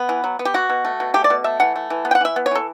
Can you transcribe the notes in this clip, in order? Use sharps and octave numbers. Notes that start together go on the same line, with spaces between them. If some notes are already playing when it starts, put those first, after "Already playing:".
Already playing: B3
E3
F#3
B3
G4
B2 F#4
B2
A3
B2
A3 G4
D5
B2
A3 E5
E3 F#5
A3
E3
B3
G5
F#5
E3 E5
B3
C#5
E3 A4